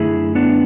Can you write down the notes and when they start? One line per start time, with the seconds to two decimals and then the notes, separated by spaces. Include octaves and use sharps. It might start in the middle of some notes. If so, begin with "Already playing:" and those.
Already playing: F#2 D3 A3 E4 G#4
0.35 B3 D4